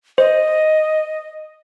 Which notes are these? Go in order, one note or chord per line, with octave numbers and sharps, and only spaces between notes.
C5 D#5